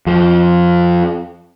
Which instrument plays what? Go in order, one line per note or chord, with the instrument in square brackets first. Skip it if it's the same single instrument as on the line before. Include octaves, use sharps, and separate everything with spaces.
[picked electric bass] F2 F3